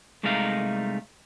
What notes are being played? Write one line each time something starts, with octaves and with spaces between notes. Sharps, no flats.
C2 G#3 A3 D#4 A#4 F5